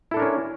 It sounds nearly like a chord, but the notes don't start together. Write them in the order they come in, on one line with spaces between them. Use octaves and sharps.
E4 A4 D4 A#4 C#4